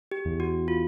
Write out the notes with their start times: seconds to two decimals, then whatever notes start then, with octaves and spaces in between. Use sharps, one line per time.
0.11 G4
0.25 E2
0.40 F#4
0.68 F4